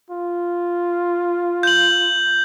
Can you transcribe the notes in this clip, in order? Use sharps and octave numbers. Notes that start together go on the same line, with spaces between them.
F4
G6 F#7